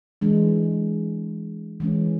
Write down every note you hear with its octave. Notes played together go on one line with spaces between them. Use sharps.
E3 G#3 D4
E3 G#3 C#4